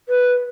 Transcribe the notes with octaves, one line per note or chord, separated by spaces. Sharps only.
B4